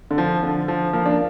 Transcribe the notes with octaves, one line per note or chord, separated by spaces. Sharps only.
D3
F3
D3
F3
F3 A#3
A#3 D4